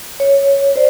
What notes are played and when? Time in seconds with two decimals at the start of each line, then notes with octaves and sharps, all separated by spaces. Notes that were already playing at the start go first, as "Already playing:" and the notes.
0.20 C#5
0.76 C5 D5